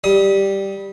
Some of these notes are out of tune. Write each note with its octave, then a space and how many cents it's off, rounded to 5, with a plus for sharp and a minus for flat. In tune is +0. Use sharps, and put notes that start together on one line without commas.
G3 +0 D#6 +25